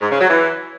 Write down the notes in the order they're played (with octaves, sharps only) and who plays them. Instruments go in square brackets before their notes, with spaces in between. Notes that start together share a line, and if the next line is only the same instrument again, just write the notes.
[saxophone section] G#2
C#3
F#3
E3